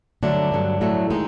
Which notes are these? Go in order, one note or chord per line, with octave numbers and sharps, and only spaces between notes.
G2 D3 F#3 A3 D4
G2 D3 F#3
A2 F#3 A3
D#3 G#3 D#4